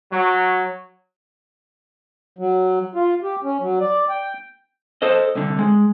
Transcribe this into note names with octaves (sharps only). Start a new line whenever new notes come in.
F#3
F#3
F4
G4
C#4
F#3
D5
G5
A4 C5 D#5
C2 D3
G#3